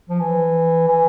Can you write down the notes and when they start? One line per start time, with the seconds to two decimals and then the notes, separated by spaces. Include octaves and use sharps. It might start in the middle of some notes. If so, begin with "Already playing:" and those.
0.09 F3
0.21 E3
0.88 E3